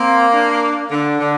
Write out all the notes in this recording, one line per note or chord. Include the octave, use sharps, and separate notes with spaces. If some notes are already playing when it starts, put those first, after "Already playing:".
Already playing: A#3 C4
D4
D3 D4
D3